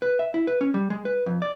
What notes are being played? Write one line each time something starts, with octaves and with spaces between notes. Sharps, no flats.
B4
E5
E4
B4
C#4
G3
G#3
B4
F2
D5